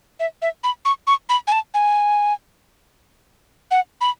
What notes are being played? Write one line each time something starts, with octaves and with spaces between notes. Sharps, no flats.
E5
E5
B5
C#6
C#6
B5
G#5
A5
G#5
F#5
B5